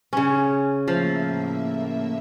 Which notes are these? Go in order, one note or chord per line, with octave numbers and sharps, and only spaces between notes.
C#3 C#4
A2 F3 A#3 E5 F5